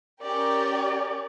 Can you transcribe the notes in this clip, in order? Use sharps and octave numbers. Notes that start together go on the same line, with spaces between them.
C#4 G4 A#4 D5